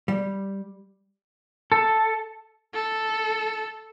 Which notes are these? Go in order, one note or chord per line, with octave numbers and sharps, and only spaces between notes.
G3
A4
A4